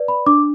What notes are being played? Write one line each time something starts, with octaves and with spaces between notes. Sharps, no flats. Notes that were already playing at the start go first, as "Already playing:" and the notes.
Already playing: B4 D5
B5
D4 D6